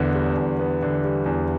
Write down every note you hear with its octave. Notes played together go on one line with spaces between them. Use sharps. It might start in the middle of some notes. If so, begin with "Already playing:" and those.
Already playing: E2 D3 B3
G3
E2
B3
D3
G3
E2